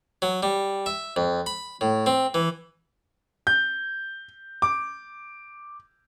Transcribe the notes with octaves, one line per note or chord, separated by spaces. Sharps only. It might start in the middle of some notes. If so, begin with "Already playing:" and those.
F#3
G3
E5
F2
B5
A2
C4
E3
G6
D6